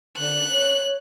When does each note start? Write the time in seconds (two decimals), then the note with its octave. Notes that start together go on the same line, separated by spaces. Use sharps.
0.17 D3 F#6
0.52 C#5